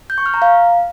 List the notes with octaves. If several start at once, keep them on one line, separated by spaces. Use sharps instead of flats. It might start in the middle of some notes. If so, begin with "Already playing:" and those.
G6
C#6
F6
A#5
F5